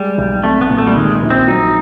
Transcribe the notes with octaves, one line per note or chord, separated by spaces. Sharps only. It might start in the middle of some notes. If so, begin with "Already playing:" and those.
Already playing: G3 G#3
B1
A3 C4
B3
A#2
A3
G3
D#3 G#3
A#1
C4
F#3 D#4